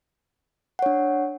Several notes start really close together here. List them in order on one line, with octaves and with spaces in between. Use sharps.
F#5 C#5 D4